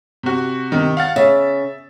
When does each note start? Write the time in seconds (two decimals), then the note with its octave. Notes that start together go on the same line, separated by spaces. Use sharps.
0.23 C3 F#4
0.72 C3 D#3
0.97 F5 F#5 A6
1.16 C#3 E5